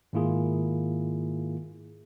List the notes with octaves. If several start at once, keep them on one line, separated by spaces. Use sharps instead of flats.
G#2 D#3 A#3 E4 F4 G#4